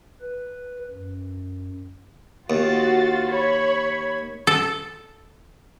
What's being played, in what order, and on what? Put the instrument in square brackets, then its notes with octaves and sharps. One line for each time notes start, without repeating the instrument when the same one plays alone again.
[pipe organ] B4
F#2
[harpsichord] D#2 [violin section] F4 F#4 A6
[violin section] C#5 B5 G#6
[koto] A4